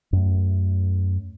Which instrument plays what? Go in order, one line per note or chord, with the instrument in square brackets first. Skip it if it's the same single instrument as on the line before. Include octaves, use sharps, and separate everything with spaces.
[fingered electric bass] F#2 A3